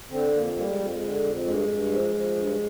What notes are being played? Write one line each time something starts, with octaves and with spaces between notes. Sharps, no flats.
D3 C4
F2 A#3
G3 A#3
G#3
F2
G#3
D3
F2
G2 G#3
G2
F3
F3
G2